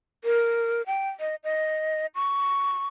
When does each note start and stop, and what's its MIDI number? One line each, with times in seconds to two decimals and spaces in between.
0.24 0.82 70
0.86 1.10 79
1.20 1.35 75
1.44 2.06 75
2.15 2.87 85